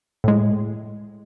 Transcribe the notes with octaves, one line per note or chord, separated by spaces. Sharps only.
A2 G#3